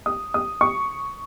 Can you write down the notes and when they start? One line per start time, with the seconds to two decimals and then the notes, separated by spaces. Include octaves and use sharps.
0.06 D#6
0.34 D#6
0.61 C#6